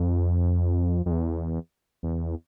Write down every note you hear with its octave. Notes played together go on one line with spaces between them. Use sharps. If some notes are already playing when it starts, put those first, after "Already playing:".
Already playing: F2
F2
E2
E2